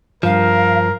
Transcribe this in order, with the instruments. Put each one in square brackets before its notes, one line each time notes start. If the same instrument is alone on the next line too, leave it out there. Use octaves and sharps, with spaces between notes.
[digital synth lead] G2 [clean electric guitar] F3 [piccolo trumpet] A#4 [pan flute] F5